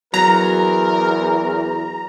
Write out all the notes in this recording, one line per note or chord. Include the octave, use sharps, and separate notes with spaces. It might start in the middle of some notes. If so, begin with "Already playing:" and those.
E2 F#3 A#4 A#5